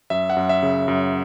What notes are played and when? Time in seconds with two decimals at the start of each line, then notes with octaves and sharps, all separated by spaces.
0.10 F#2 E5
0.30 F#5
0.36 F#2
0.49 E5
0.63 C#3
0.88 F#2